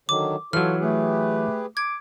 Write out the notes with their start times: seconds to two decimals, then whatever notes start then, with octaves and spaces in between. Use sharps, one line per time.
0.09 D3 D#3 F#3 D6
0.53 E3 F#3 F4 A4 C#5 F6
0.81 A3 G4 G#4 B4
1.77 D6 G#6